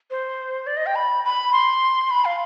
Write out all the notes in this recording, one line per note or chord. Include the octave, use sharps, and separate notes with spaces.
C5
D5
D#5
G5
B5
B5
C6
B5
F5